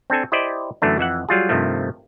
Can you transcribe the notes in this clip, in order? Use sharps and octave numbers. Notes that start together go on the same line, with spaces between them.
C4 D4 A4 G#5
E4 G4 C5 D5 D#5
F#2 D3 E3 A3 D4
F2 E3 E5 F#5
F#3 G3 F4 G#4
G2 C3 D#3 F3 A3